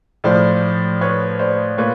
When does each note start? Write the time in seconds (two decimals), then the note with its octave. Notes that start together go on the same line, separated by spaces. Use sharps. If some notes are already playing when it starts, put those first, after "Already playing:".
0.24 A2 F3 C5 D5
1.01 B4 C#5
1.39 C5 D5
1.78 A#2 B4 C#5